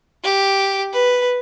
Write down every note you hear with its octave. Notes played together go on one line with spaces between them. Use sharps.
G4
B4